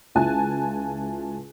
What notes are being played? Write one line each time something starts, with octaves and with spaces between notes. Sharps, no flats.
C#2 E4 F4 G#5 A5 F#6